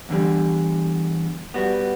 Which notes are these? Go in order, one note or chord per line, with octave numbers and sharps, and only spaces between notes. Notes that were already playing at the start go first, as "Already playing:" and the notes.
E2 D3 G3
G3 B3 F#4